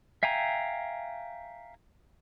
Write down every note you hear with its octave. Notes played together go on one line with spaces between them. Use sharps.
E5 F5 G5 G#5 A#5